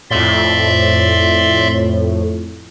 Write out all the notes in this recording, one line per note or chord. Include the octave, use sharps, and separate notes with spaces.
F2 A2 D5 E5 C6